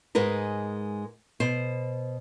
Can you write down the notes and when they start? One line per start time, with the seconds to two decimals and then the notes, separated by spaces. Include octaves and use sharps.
0.15 G#2 G#3 A#4 B4
1.40 B2 C5